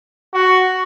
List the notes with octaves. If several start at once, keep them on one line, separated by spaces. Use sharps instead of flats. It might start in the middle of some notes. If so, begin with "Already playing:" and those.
F#4